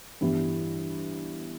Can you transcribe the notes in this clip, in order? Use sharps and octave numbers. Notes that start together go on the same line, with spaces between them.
G2 E3 G3 B3 E4